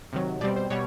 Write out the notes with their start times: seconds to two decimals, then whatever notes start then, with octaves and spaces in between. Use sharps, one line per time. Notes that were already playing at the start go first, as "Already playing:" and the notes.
0.13 C3 D#3 F#3
0.41 B2 G3 C4 D5
0.56 C5
0.70 B2 G3 C#5